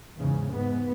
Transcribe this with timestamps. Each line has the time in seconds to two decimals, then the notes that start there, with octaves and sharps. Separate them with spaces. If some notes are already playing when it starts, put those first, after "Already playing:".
0.17 E2 G#2 C#3
0.53 G#2 B3